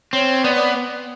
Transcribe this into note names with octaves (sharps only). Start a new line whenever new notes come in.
C4 C#5
B3 D5
D5